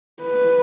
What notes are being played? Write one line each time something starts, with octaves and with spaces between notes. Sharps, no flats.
B4